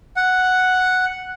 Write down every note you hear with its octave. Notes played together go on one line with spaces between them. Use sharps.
F#5